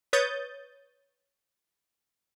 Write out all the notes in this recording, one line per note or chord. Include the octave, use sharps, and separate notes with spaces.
B4 C#5 D#6 G6 A6